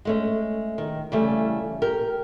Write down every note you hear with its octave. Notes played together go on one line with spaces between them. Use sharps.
G#3 A3 C#4
D#3
C#3 E3 G3 A3
G4 A#4